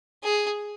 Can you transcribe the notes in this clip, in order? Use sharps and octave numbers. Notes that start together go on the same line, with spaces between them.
G#4